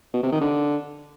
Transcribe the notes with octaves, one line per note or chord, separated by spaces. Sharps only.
B2
C3
D#3
D3